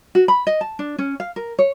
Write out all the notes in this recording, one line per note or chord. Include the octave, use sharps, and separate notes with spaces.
F#4
B5
D#5
A5
D4
C#4
F5
A#4
C#5